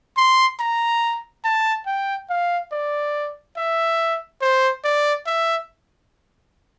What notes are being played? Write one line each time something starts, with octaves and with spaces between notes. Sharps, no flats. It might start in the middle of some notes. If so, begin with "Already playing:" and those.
C6
A#5
A5
G5
F5
D5
E5
C5
D5
E5